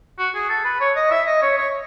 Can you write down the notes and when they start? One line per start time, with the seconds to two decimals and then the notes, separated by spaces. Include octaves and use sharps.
0.18 F#4
0.35 G#4
0.49 A4
0.65 B4
0.80 C#5
0.96 D#5
1.11 E5
1.27 D#5
1.42 C#5
1.57 C#5